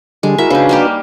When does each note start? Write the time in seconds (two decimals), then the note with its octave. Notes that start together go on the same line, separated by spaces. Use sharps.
0.23 D3 G3 G#3
0.38 E4 F#4 A#4 E5
0.50 C#3 D4 D#4 F#4 B4
0.69 G3 A#3 G4